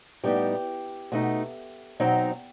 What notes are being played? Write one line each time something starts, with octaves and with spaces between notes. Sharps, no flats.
A2 G3 B3 D#4 G4
B2 A3 D#4
B2 F#3 C4 D#4